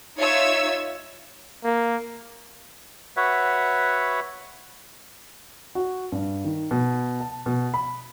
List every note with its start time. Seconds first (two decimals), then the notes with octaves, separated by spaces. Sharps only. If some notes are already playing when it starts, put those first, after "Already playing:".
0.18 D#4 F4 C#5 E5 E6 G#6
1.64 A#3
3.17 F#4 B4 C#5 E5 F#5
5.75 F#4
6.12 G2
6.44 D#3
6.71 B2
7.20 A5
7.46 B2
7.74 B5